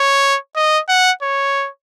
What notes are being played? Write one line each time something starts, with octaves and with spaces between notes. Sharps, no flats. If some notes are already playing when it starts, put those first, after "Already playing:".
Already playing: C#5
D#5
F#5
C#5